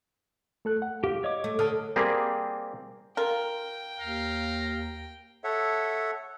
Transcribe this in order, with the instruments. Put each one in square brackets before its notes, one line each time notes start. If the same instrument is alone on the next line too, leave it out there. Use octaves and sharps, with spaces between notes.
[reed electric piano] A3 A4 F#6
F#5
[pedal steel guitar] G4 [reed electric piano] F5
[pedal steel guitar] C#5 D6 [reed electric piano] D#5
[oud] A3
[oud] D3 [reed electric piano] A5 D#6 F6
[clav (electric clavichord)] G3 A#3 C4 G4 G#4
[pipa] F4 A#4 [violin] G5
[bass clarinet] D#2 [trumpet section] F5 A#5
[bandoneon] A4 C#5 E5 F#5